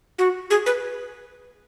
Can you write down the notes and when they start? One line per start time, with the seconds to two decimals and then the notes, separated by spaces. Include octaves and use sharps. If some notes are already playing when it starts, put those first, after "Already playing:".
0.19 F#4
0.50 G#4
0.66 B4